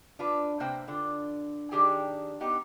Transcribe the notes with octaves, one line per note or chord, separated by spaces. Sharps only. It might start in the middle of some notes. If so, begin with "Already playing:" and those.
D4 F4 B4
C3 A#3 C5 G5
D3 F4
D#3 D4 G4 G#4 G5
B3 D#4 G4